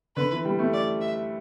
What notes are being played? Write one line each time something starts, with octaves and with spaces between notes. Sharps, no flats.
D3 B4
E3
G3
A3
D5
E5